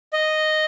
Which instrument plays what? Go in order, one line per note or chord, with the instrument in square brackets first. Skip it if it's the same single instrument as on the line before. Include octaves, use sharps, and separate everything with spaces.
[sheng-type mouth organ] D#5